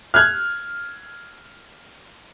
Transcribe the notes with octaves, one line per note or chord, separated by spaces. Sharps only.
F6 F#6 G#6